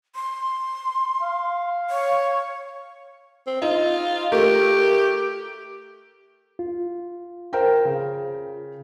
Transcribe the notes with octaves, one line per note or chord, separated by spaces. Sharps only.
C6
F5
C#5
C4
D#4 F4
A3 G4 A#4
F4
A#4 C5 G5
C#3